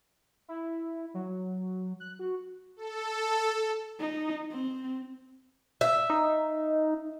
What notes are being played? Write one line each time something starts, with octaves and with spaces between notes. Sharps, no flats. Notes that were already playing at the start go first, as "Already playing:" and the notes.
E4
F#3
F#6
F#4
A4
D#4
C4
E5
D#4